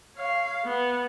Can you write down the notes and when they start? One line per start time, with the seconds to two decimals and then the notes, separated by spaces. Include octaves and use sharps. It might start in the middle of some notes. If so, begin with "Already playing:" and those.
0.15 C#5 F5
0.65 B3